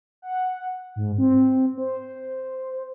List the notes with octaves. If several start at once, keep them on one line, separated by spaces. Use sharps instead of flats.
F#5
G#2
C4
C5